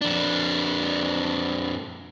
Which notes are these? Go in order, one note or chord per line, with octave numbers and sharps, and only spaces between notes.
F2 D4